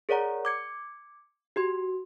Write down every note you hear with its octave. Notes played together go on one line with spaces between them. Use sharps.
G#4 A#4 C#5 D5 F#5 A#5
D6 G#6 C#7
F#4 G4 C6